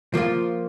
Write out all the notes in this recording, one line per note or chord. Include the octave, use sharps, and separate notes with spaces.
F3 A#3 F4